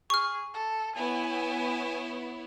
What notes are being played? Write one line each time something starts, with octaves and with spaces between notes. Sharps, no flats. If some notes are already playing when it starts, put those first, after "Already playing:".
G#4 C#6 F6
A4
B3 E4 C#5 G#5